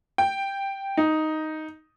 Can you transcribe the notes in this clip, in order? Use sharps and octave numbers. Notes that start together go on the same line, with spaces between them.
G5
D#4